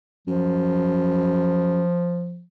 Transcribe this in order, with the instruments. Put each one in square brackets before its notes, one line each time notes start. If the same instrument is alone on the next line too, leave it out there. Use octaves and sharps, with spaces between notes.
[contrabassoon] F#2 [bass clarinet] F3